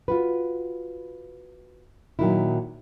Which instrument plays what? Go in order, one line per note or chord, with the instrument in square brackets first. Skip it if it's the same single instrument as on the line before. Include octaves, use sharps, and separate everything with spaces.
[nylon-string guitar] F4 F#4 B4
A#2 D#3 F#3 A#3 D#4 E4